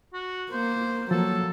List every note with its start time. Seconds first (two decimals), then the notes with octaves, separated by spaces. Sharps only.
0.14 F#4
0.52 A#3 C5
1.11 F3 F#3 A#3 A4